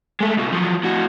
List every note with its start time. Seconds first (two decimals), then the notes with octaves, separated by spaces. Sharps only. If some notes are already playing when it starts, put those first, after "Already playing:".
0.20 G#3 A3
0.38 C#2 B2
0.53 F3 F#3
0.84 A2 F#4